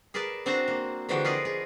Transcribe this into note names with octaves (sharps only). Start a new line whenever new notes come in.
G#4 A#4 B4 D5 A5
C4 D4 F#4 C5 A5 A#5
A#3
D3 E3 F3 G#3 F#4 G5
F4 G#4 A#4 B4 D5 D#5
G#4